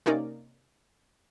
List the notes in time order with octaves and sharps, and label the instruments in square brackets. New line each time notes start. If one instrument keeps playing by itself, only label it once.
[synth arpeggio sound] C3 A#3 C#4 D#4 A#4 D5